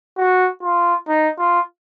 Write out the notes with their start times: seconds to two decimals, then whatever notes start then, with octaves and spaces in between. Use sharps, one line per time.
0.18 F#4
0.63 F4
1.08 D#4
1.39 F4